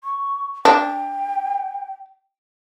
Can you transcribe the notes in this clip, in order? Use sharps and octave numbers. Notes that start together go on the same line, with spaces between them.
C#6
D4 G5